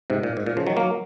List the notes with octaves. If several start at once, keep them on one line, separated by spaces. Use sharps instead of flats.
G#2 C3
A#2
G#2
A#2
C#3 F3
D#3 F#3
F#3 A#3